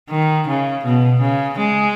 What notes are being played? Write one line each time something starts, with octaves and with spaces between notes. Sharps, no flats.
D#3
C#3
B2
C#3
G#3